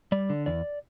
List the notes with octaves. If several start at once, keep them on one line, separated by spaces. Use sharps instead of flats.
G3 D5
D3
E2 D5